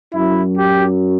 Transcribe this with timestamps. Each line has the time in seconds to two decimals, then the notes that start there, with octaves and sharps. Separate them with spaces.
0.13 F#2 F#3 E4
0.56 G4